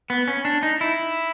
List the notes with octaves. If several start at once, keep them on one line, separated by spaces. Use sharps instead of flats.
B3
C#4
D4
D#4
E4